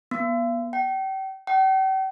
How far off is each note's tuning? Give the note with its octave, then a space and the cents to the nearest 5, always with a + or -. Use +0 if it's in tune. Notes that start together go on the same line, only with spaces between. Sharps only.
B3 -35
G5 -35
G5 -45